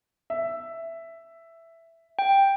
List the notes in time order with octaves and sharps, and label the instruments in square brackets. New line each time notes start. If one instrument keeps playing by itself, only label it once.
[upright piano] E5
[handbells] G5